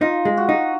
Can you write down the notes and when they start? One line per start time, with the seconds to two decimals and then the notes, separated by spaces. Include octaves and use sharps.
0.01 D#4 F4
0.25 G#3
0.37 F#4
0.49 D#4